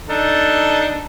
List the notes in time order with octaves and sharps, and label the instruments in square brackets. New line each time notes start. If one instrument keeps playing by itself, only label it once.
[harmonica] D4 D#4 A4